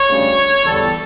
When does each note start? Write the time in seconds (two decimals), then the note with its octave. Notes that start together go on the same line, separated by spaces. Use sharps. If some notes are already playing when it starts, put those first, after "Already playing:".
Already playing: C#5
0.08 D2 C#3 G3
0.64 E2 D3 G3 A4